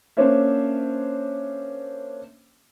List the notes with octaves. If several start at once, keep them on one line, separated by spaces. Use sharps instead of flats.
A#3 C#4 D4 C5 C#5 E5